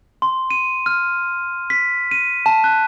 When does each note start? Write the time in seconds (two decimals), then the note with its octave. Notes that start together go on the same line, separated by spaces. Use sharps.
0.22 C6
0.51 D#7
0.86 F6
1.70 B6
2.11 D#7
2.46 A5
2.64 F#6